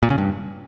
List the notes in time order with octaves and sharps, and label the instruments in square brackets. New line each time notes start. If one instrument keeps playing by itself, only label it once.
[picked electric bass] A#2
C#3
G2